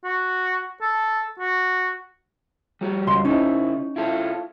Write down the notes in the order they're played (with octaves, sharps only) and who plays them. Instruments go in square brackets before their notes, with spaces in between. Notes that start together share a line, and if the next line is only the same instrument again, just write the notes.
[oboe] F#4
A4
F#4
[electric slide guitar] G3 F#4 G4
[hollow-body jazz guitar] C#2 C6
[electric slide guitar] C#3 E4 [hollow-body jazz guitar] C#4 D#4
[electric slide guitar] E4 F4 A4